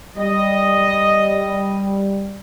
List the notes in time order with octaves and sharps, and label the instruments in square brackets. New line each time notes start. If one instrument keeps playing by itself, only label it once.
[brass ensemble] G3 [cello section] D#5